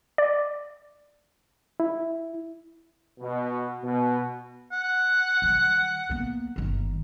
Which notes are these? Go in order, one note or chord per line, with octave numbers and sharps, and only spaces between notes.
D5
E4
B2
B2
F#5
D#3 G3
A#3 B3
G1 D#3